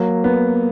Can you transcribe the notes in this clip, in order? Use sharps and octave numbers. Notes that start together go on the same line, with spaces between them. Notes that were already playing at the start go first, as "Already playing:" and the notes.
Already playing: F#3 A#3
B3